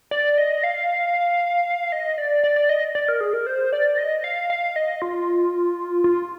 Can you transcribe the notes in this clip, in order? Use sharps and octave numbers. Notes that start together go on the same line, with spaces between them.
D5
D#5
F5
D#5
D5
D5
D5
D#5
D5
A#4
G#4
A#4
C5
D5
D#5
F5
F5
D#5
F4
F4